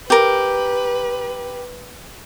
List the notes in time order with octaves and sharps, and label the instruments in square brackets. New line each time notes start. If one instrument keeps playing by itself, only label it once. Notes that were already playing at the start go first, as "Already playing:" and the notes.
[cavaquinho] G4 A#4 [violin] B4